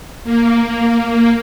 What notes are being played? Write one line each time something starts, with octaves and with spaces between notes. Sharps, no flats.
A#3